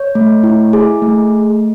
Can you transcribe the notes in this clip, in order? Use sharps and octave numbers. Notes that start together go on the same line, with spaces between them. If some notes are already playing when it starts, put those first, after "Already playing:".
Already playing: C#5
A3
E4
G#4
A3